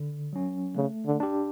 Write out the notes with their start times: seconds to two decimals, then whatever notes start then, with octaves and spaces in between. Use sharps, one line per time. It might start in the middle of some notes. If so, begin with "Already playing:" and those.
Already playing: D3
0.33 F#3 C#4
0.76 C#3 A3
1.06 D3
1.20 D4 G4